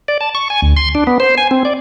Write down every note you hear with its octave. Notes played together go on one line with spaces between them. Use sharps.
D5
A5
C#6
G#5
D2
C6
D4
B3
C5
G#5
C4
D5